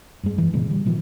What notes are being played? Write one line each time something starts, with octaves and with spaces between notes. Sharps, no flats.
G2 G#3
E3
A#2 C#3 E3 G#3
D3 G3
A#2 D#3 F3